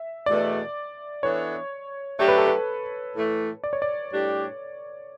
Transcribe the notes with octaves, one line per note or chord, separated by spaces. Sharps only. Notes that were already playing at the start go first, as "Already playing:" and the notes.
Already playing: E5
E2 B2 A3 D5
E3 B3 D4 A4 C#5 E5
F#3 A3 D4 G4 C#5
B4
A4
B4
A2 E3 A3
D5
C#5
D5
A2 G3 D4 G4